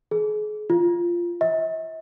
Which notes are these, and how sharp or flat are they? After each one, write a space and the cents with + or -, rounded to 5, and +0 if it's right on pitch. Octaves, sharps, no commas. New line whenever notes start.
G#4 +35
F4 -10
E5 -45